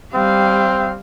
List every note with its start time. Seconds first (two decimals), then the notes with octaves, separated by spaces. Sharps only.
0.15 G3 C4 F5